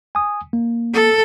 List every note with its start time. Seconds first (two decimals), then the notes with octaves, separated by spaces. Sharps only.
0.15 G#5 D#6
0.53 A#3
0.94 A4